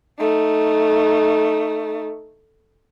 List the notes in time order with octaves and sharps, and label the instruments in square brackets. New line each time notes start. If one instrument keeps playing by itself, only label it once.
[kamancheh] A3 D#4